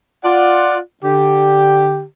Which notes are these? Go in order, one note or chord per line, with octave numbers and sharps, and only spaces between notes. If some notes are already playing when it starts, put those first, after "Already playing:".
F4 D5 F#5
D3 G4